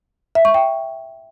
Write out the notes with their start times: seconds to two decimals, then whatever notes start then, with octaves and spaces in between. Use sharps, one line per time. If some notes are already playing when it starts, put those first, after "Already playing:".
0.35 E5
0.45 C#6
0.54 G5